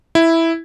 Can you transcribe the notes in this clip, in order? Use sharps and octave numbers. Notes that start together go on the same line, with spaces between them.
E4